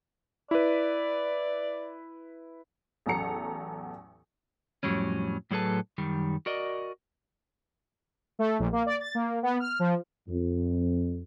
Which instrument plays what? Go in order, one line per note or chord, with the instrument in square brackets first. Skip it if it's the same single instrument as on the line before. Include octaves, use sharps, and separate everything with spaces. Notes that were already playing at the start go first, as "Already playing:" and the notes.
[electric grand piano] E4 B4 [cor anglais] D5
[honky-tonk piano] A1 E2 F#3 A4 A#5 C#7
[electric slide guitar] F2 A2 F#3 G3 C#4
A2 F#3 G#4 A4 B4 A5
F#2 D#3 G3
F#4 A#4 D5 D#5
[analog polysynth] A3
A#1
A#3
D5
A6
A#3
B3
F6
F3
[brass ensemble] F2